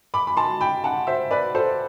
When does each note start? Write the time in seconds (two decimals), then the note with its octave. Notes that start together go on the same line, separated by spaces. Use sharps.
0.14 B5 D6
0.27 B5
0.37 A5 C6
0.61 G5 B5
0.84 F#5 A5
1.07 C5 E5
1.31 B4 D5
1.55 A4 C5